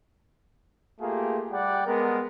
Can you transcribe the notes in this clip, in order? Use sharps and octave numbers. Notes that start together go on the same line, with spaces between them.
A3 A#3 F4 G4 G#4
G3 D5 F#5 G5
G#3 B3 A#4